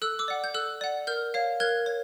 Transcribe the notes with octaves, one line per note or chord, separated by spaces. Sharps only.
A4 E6 F#6
D6 E6
D5 F#5
G6
A4 E6 F#6
D5 F#5
A#4 F6 G6
C#5 F5
A#4 F#6 G#6
C#5